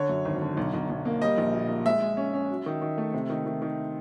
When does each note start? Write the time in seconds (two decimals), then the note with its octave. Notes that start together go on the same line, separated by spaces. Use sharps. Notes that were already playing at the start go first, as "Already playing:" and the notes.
Already playing: D3 C#5
0.09 F#2
0.25 G#1
0.42 D3
0.57 B1
0.74 B1
0.90 B1
1.05 A#3
1.21 G3 D#5
1.38 A#1
1.53 A#2
1.69 A#3
1.86 G#3 E5
2.02 G#3
2.17 C#4
2.33 C#4
2.50 F#3
2.66 D#3
2.82 D#3
2.98 A3
3.14 C3
3.30 D#3
3.46 D#3
3.62 D#3